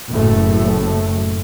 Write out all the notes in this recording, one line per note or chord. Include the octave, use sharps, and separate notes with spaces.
F#1 A2 A3